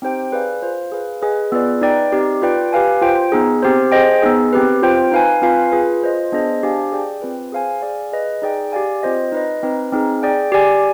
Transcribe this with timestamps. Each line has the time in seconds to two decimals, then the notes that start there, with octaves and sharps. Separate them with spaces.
0.02 C4 D#4 G4 C5 G5
0.32 G#4 B4 D5 F5 G#5
0.62 F4 C5 F5
0.92 G#4 B4 F5
1.22 G#4 B4 D#5 G#5
1.52 B3 F4 G#4 B4 D5
1.82 D#4 B4 D5 G5
2.12 C4 D#4 G4 D5
2.42 F4 B4 D5 G5
2.73 G4 B4 F5 G#5
3.02 F4 C5 G5
3.32 B3 D#4 G#4
3.62 C4 G4 C5
3.92 G#4 C5 D#5 G5
4.22 B3 D#4 G#4
4.53 C4 G4 B4
4.83 C4 F4 C5 G5
5.12 D#4 B4 F5 G#5
5.42 C4 F4 B4 F5 G#5
5.72 F4 G#4 B4
6.03 F4 C5 D#5
6.32 B3 D4 G#4 C5 D#5
6.63 D4 G4 C5 F5 G#5
6.92 G#4 D5 G5
7.22 C4 F4 B4
7.52 G#4 C5 F5 G#5
7.82 G#4 D5 F5 G#5
8.12 G#4 B4 D#5
8.42 D#4 G#4 D5 G5
8.72 G4 D5 F5 G#5
9.03 C4 F4 C5 D#5
9.32 D#4 B4 D#5
9.63 C4 D#4 B4
9.92 C4 D#4 G#4
10.23 G#4 D5 G5
10.52 G4 D5 G#5